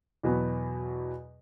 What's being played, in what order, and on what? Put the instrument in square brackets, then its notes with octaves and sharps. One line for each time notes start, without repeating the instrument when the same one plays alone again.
[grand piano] E2 B2 F#3 B3